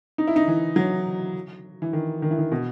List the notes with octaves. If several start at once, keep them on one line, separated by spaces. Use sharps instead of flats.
D#4
E4
D#4
E3
F#3
E3
D#3
D#3
E3
D#3
B2